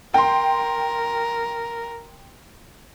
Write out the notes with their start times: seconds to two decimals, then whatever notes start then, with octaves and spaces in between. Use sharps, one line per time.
0.14 A#4 G5 C6